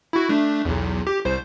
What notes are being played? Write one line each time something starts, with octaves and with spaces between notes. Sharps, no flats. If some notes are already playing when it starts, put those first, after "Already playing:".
E4 F#4
A3 D4
B1 E2
G4
C2 C5